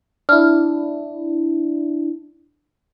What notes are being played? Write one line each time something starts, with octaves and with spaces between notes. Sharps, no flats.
D4 E4 F6